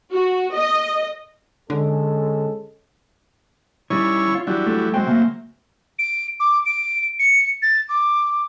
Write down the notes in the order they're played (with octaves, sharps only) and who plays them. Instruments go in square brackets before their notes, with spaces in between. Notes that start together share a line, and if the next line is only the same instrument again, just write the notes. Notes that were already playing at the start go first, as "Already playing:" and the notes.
[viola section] F#4
D#5
[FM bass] D3 [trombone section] G#3 C#4 A4
[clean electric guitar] D#3 G3 [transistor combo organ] C#4 E4 C#5
[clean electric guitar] F4
[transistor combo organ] E3 F#3 G3 [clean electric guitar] D4
[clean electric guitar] A3
[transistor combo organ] F#3 C4 [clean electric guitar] G#3 G5
[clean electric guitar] C#3 A3 A#3
[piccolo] D7
D6
D7
C#7
A6
D6